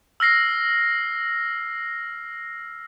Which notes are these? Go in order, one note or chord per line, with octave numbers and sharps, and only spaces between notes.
E6 F6 A#6 C7